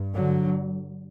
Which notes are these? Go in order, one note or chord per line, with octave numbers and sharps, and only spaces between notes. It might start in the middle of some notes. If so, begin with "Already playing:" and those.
Already playing: G2
D3 F#3